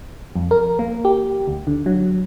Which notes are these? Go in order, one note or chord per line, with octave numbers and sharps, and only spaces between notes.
F2
A#4
A#3
G4
D2
D3
F#3